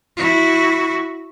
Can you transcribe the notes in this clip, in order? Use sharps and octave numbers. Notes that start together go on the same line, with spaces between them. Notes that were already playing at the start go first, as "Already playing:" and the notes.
E4 F#4